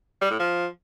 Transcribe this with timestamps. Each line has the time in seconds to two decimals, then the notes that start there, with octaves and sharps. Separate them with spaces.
0.21 G3
0.30 A2
0.39 F3